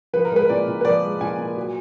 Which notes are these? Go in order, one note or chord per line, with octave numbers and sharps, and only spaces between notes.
F3 B4
A#4
G#3 B4
A#2 D5
A#2
B4
F3 D5
G#3
A#2 G#5
A#2
F#3